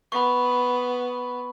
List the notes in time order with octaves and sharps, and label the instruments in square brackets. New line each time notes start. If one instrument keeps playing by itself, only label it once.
[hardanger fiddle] B3 [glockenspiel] B5 C#6